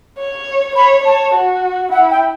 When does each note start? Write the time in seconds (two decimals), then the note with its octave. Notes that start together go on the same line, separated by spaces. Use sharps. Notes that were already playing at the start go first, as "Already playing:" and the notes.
0.18 C#5
0.76 C#5 B5
1.04 C#5 A5
1.34 F#4
1.91 E4 F#5
2.11 G5